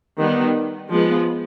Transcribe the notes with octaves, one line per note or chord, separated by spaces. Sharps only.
D#3 G3 B3
F3 G#3 B3